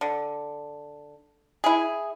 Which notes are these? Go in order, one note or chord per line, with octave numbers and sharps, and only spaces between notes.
D3
E4 G#4